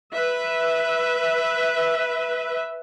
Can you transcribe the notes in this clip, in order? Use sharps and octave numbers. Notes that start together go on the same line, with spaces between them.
B4 E5